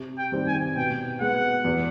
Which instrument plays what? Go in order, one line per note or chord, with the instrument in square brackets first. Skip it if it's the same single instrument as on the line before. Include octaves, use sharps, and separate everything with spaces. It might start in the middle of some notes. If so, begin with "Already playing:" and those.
Already playing: [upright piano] C3
[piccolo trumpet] G5
[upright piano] D#3 G3 C4
[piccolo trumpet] G#5
[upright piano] B2 [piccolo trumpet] G5
[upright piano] G#3 B3 [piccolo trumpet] F#5
[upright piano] E2